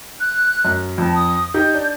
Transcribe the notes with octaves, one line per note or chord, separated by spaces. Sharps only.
F#6
F#2
F2 A5
D#6
D#4 G4 G6
D4